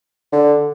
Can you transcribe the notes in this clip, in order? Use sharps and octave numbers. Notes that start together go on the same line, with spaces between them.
D3